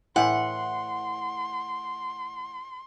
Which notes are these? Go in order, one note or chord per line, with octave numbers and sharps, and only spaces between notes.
A2 E3 F#5 C6